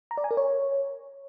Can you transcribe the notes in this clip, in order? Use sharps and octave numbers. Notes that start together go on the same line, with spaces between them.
A#5
D5
G#5
A#4
C#5